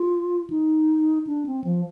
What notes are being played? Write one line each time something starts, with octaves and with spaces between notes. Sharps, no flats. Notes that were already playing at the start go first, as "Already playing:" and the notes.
Already playing: F4
D#4
D4
C4
F3